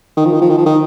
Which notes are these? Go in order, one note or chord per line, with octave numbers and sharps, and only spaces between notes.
D#3
F3
D#3
F3
D#3
F3
D#3